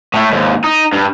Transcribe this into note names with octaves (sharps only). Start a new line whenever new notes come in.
A2 A3
D#2 G#2
D#4
G2